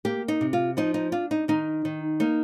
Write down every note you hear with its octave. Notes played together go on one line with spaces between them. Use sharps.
A#3 G4
D#4
C3
F4
F3 D#4
D#4
D4 F4
D#4
D#3 D#4
D#3
A#3 D#4